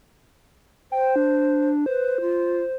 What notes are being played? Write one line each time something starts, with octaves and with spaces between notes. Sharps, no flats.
C5 G5
D4
B4 C5
F4